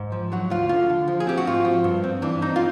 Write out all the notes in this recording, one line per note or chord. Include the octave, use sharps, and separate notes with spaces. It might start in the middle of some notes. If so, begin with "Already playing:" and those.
Already playing: G#2
F3
F#3 F#4
D2 F4
D3 F4
D3
F3
G#4
C4 G4
F#4
G#2 F4
F3
G2
C4
E3 D4
C4 D#4
F4